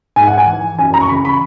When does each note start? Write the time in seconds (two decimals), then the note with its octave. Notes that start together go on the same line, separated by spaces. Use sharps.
0.16 G#2 G#5
0.27 F#5
0.38 G#5
0.47 E3
0.79 F#2 G#5
0.94 A#5
1.01 C#6
1.09 C#3 E3 B5
1.25 B5